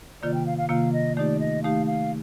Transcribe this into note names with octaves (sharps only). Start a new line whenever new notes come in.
C3 D#3 A#3 F4 D5
G5
F5
F5
C3 D#3 A#3 F4 F5
D#5
D#3 A3 D#4 G4 D5
D#5
D#3 A3 D#4 G4 F5
F5